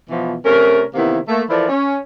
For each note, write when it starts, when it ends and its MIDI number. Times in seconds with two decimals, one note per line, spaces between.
0.10 0.35 47
0.10 0.35 52
0.10 0.35 53
0.45 0.82 48
0.45 0.82 57
0.45 0.82 61
0.45 0.82 70
0.94 1.18 48
0.94 1.18 51
0.94 1.18 52
0.94 1.18 58
0.94 1.18 59
0.94 1.18 64
1.28 1.41 57
1.28 1.41 58
1.50 1.69 52
1.50 1.69 53
1.50 1.69 64
1.50 1.69 69
1.50 1.69 70
1.50 1.69 74
1.69 1.99 61